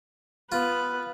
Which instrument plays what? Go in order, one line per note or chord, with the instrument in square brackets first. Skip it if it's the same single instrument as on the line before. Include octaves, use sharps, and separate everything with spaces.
[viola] B3 B4 [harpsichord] F4